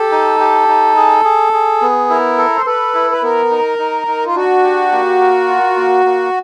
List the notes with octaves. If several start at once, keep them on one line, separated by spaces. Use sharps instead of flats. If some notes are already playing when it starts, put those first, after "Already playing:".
Already playing: G4 A4
D#4
G4
D#4
G#4
G#4
G#4
B3
E4 A#4
A4
C5
A4 B4
E4
B4
B3 A#4
D#4
D#4
D#4
F4
D4 F#4
G4
A#3
A#4
F4
A#3
A#3